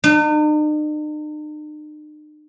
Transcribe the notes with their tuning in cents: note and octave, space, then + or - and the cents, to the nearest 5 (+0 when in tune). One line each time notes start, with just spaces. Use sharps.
D#4 -45